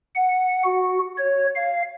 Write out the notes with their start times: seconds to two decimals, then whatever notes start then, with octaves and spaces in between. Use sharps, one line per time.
0.15 F#5
0.65 F#4
1.18 C#5
1.55 F5